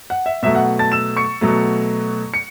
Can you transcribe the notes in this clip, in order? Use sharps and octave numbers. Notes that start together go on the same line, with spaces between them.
F#5
E5
B2 F#3 A3 E5
F#5
A5 A6
E6 E7
C#6 C#7
B2 F#3 A3
C#7